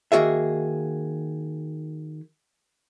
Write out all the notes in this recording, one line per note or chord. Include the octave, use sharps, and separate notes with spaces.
D#3 A#3 F#4 G#4 E5